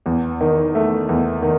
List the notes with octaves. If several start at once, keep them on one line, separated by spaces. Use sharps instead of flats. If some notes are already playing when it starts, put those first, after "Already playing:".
E2
D#3
A3
E2
D#3